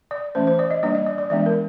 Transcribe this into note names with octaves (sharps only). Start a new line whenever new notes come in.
D5
E3 A3 C#4 C5
C5
D5
D#5
G3 A#3 D4 D5
D#5
D5
D5
E3 G#3 B3 D4 D5
A#4